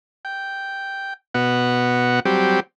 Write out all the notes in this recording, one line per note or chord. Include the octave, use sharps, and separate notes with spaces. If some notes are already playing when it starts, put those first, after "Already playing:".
G5
B2 B3 F#4 F#5
F#3 G3 C4 G4